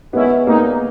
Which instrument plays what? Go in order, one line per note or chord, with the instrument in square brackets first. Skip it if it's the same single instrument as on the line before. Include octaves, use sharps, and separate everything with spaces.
[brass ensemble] D#3 G#3 C#4 E4 [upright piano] B3
[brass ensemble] A#2 G#3 D#4 [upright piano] A#3